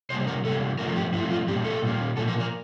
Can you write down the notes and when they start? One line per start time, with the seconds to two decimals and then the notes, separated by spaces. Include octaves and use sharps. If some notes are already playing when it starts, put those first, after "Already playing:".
0.10 C3 G3 A#3 C5
0.27 A#4
0.44 C3 G3 A#3 A4
0.79 G2 F3 A3 C4 A#4
0.96 G4
1.13 G2 F3 A3 C4 E4
1.31 F4
1.48 A#2 G3 A#3 G4
1.65 A4
1.82 A#2 G3 A#3
2.17 A#2 F3 A#3 A4
2.28 A#4
2.40 A#4